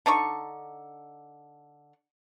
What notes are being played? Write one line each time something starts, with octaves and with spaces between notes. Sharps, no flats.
D3 D4 D#4 C#6